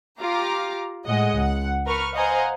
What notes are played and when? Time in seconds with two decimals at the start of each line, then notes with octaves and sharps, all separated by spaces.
0.19 F4 G4 F5 A#5 D6
1.05 A2 G#3 D#5 F#5
1.36 C#2 F#5
1.85 A#4 B4 C#6 F6
2.14 C5 D#5 F5 F#5 G#5 A#5